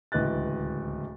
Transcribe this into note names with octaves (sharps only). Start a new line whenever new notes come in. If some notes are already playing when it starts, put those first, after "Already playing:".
D1 C#2 E3 D#5 F#6 A6